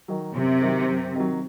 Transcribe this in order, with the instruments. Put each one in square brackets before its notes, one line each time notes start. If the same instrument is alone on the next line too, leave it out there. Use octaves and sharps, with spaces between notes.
[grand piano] D#3 F#3
[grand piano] F#2 [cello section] C3
[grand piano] D#3 F#3
F#2
D#3 F#3